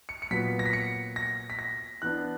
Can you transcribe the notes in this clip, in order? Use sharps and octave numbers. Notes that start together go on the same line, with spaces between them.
C#7
C#7
A#2 F#3 B3 B6
A#6
B6
C#7
A#6
B6
A#6
E3 B3 D4 F#6